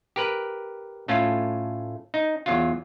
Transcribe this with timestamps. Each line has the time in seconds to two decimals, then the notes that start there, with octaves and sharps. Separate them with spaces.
0.16 G4 A#4 B4
1.08 A2 A3 C#4 F4
2.14 D#4
2.46 E2 F#3 F4